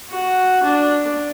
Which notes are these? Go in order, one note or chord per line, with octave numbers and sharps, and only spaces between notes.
F#4
D4